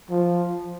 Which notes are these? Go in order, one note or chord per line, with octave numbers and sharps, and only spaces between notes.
F3